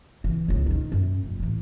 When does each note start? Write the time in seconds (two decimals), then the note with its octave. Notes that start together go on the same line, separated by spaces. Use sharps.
0.24 C#3 E3
0.48 C#2 C#3
0.66 D#3 D#4
0.92 F#2
1.23 F1
1.40 A2 E3